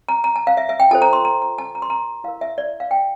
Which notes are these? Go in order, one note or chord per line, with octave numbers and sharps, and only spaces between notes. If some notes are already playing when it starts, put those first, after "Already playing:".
A#5
A#5
A5
F5
E5
E5
G5
F4 A4 C5 A5
A#5
C6
A#5
A#5
A5
A#5
C6
A#5
E4 A#4 F5
E5
D5
F5
G5